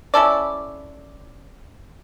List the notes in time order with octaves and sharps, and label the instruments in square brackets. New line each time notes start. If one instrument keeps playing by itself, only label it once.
[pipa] C#4 E4 A4 D5